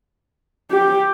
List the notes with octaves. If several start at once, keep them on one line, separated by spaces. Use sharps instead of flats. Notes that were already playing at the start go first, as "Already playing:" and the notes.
G4